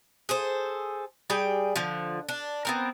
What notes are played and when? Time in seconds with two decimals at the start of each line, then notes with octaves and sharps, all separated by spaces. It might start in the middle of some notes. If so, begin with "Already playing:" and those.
0.29 G#4 A4 C5
1.30 G3 G#4 G5 G#5
1.76 D3 F3
2.29 D4
2.65 B3 C4 A#4